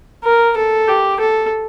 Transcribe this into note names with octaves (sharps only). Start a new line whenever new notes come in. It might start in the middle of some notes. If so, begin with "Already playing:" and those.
A#4
A4
G4
A4